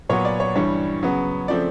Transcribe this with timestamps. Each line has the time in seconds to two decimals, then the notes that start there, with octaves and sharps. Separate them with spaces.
0.09 A#2 F#3 B3 C#5
0.25 D5
0.40 C#5
0.56 G2 E3 G3 C#5
1.03 C#3 F#3 B3
1.48 C#3 F3 A3 C4 D5